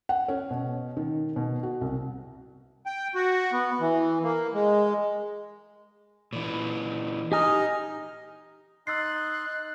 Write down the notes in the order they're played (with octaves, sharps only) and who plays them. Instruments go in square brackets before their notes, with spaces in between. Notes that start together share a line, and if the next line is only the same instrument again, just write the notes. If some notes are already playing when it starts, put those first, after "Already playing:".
[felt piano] F#5
C#4
B2
D#3
B2
F#4
C2
[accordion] G5
F#4
B3
E3
A#3
G#3
[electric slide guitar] A#2 E3
[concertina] D#4 D#5 [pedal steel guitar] G4 G#5 F6
[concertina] D#4 C6 [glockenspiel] E6 A6 C7 [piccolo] F#6